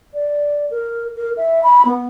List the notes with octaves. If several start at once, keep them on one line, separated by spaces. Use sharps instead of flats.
D5
A#4
A#4
E5
B5
B3